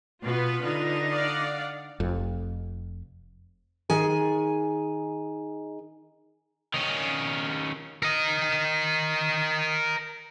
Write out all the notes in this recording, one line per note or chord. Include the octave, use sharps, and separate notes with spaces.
B2 B3 F4 B4
D3 D#4
D5 F5 F#5
F1 F2
D#3 G#4 G#5
D#3 C#4
A#4 D#5